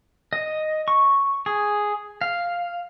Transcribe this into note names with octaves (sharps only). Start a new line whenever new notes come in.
D#5
C#6
G#4
F5